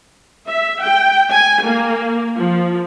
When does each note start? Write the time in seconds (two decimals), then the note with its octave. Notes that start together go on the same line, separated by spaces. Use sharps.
0.47 E5
0.82 G5
1.32 G#5
1.66 A#3
2.38 F3